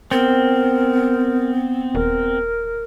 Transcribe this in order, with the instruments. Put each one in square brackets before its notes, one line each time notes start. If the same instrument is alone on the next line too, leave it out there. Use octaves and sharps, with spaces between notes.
[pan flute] B3 [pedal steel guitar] C4 [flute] A#4
[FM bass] D#1 [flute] A#4